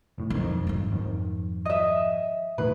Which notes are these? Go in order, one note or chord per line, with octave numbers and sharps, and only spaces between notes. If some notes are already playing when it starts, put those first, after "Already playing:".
F1 A2
E1 F2 D#3
G#2 F3
F2 D#3
D#5 E5
E1 A2 D#3 B4